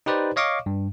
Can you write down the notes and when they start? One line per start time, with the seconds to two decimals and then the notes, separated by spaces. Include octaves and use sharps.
0.06 D#4 G4 B4 C5 D5
0.36 C#5 D#5 F5 C#6 D6
0.66 G2